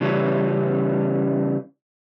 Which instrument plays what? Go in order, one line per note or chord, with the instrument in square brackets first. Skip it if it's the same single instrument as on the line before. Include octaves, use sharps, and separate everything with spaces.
[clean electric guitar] C#3 E3 G3 C#4